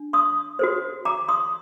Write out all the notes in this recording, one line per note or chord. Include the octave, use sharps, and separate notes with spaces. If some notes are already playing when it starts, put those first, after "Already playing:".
Already playing: D4
C6 D#6
F#4 A4 C5
A#5 D6
C6 D#6